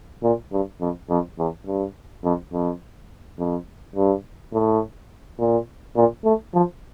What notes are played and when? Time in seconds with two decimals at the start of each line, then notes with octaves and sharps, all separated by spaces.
0.23 A#2
0.52 G2
0.81 F2
1.10 F2
1.38 E2
1.67 G2
2.24 F2
2.53 F2
3.38 F2
3.96 G2
4.53 A2
5.40 A#2
5.96 A#2
6.25 A3
6.54 F3